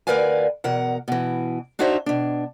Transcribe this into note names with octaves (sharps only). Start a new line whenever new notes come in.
D2 A#4 B4 D5 F5 G#5
E2 B2 A#4 F#5
B2 E3
D4 D#4 F#4 C5 C#5 E5
B2 D4